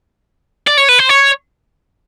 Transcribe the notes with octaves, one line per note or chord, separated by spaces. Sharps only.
D5
C#5
B4
C5
C#5